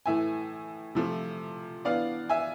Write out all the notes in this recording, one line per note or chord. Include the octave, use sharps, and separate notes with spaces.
A2 E3 A3 E5 G#5
C3 F3 A3
E3 B3 D4 D5 F5
E5 G#5